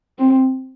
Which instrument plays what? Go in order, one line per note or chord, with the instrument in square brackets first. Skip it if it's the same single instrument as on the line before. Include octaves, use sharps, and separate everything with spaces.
[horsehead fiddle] C4